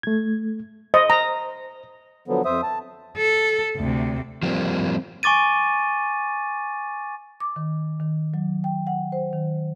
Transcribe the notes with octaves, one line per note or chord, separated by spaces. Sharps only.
A3 G#6
C5 D#5
A#5
D3 F3 F#3 B3
F2 C5 E5 D#6
A5
A4
D2 C3
F3 G3 A#3 C4
G#5 C#6 D6 A6 D#7
D6
D#3
D#3
F#3
G5
F#5
C5
D#3